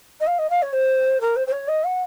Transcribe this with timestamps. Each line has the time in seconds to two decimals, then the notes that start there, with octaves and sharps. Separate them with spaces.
0.20 D#5
0.26 F5
0.38 D#5
0.49 F5
0.62 C#5
0.72 C5
1.20 A#4
1.36 C5
1.47 C5
1.51 C#5
1.68 D#5
1.83 F#5